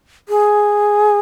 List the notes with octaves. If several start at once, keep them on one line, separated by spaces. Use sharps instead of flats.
G#4